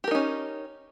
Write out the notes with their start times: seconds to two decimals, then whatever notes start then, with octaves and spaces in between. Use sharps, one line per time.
0.04 G4
0.08 A#4
0.11 D#4
0.15 C#4